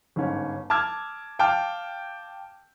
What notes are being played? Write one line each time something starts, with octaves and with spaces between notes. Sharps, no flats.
G1 G#2 C#4
A5 D6 E6 F6 G#6
F5 G5 A5 D6 F6